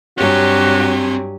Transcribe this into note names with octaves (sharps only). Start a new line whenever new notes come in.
G2 F#3 C4 F#4 G4 C#5 G#5